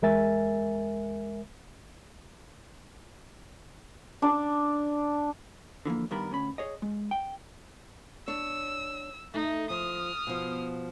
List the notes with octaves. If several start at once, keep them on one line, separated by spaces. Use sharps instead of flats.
E2 G#3 A#4 E5 G#5 A6
D4 D5
D3 E3 F3 A#3
G2 D#3 G3 B3 A#4 B5
D2 C#4 B5
G#4 C#5 D#5
G#3
G5
D4 C#5 E6
A3 D#4
F3 D#6 F6
B2 F3